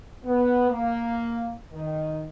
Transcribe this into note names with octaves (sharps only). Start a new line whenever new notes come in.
B3
A#3
D#3